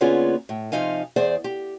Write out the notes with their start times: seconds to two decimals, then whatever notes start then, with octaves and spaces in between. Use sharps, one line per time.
0.01 D3 A#3 B3 C#4 F4 G#4
0.49 A2
0.72 C3 F3 D#4 F5 G#5
1.16 E2 G#4 C5 D5
1.44 G4